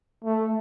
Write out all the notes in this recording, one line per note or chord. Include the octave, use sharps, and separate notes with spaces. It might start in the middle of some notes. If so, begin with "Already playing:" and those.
A3